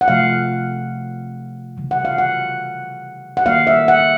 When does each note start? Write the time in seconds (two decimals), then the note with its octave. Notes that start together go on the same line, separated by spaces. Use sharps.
0.01 F#5
0.08 C3 F3 A3 F5
1.77 C#3 E3 G3
1.91 F#5
2.05 F5
2.18 F#5
3.37 F#5
3.45 D#3 G3 A#3 F5
3.67 E5
3.88 F#5